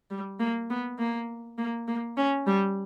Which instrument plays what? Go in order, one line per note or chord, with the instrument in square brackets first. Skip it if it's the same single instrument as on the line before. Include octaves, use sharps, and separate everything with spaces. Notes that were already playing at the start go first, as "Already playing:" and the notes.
[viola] G3
A#3
B3
A#3
A#3
A#3
C#4
G3